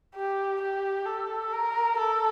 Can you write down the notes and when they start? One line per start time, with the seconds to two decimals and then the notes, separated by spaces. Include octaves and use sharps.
0.15 G4
0.61 G4
1.06 A4
1.52 A#4
1.98 A4